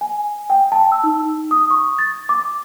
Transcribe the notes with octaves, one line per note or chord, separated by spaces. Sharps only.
G#5
G5
A5
E6
D#4
D#6
C#6
A6
D6